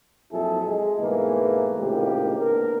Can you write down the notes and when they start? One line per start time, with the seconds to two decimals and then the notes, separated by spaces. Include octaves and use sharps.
0.32 F2 A#2 F#3 E4 G#4 A4
0.65 G#3
1.00 G#2 B2 E3 A3 A#3
1.79 C#2 A2 C3 D#3 A#3 G4
2.38 A#3 B3 D4 A#4